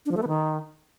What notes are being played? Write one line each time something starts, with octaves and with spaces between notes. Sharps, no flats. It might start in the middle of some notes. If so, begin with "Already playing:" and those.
D4
F3
A3
B3
D#3